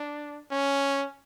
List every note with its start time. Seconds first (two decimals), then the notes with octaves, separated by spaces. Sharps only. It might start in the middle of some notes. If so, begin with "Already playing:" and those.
Already playing: D4
0.51 C#4